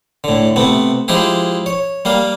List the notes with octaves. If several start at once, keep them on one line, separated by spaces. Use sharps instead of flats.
A2 D3
C3 A3 B3
F3 G#3 E4 G4 G#4
C#5
G3 A#3 F5